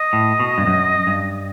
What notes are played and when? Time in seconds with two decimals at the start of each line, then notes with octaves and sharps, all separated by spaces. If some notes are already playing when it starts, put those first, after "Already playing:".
Already playing: D#5
0.13 A2
0.40 B2
0.58 G2
0.67 F#2
1.07 G2